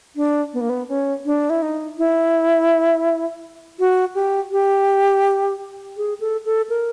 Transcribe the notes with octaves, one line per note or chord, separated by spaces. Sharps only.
D4
B3
A#3
B3
C#4
D4
E4
D#4
E4
F#4
G4
G4
G#4
A4
A4
A#4